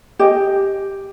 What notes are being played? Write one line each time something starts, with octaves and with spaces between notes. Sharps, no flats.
G4 D#5 G#5